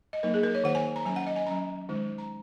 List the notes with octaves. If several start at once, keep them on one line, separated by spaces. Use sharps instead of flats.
D#5
F#3 A#3 D#4 A#4
G#4
A#4
C#5
D#3 A#3 D#4 F#5
G#5
A#5
F#3 C#4 G#5
F#5
D#5
G#5
F#3 C#4 A#5
D#3 G#3 D#4
A#5